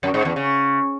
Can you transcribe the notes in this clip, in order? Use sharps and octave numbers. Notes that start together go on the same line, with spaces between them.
F#2
G#2
E2
C#3